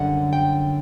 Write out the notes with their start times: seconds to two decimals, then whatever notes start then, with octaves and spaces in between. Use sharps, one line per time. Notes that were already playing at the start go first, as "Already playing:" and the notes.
Already playing: F#2 D3 G3 F#5
0.33 G5